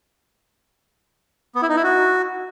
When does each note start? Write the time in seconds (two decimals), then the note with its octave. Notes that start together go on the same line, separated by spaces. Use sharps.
1.55 B3
1.62 E4
1.69 D#4
1.76 E4
1.84 F#4